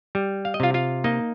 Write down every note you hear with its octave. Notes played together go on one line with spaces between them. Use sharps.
G3
F5
D#5
C3 F4 F5
F4 F5
A#3 D#4 D#5